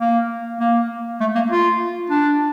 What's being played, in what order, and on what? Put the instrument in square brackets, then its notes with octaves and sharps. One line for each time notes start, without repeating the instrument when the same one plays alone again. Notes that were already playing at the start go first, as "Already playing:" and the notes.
[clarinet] A#3
A#3
A3
A#3
F4
D4